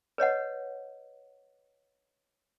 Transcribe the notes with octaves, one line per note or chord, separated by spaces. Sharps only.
B4 C#5 D#5 F#5